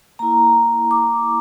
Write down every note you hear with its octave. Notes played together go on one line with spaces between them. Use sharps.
A#3 E4 A#5
D6